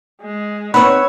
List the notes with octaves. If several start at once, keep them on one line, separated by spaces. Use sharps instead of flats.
G#3
C4 D#4 F#4 B4 C#5 E6